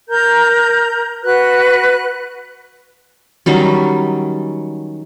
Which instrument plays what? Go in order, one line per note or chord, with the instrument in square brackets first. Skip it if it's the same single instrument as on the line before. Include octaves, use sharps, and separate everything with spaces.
[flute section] A#4 A#5 G6
F#4 B4 F#6
[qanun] D#3 F#3 G3 C#4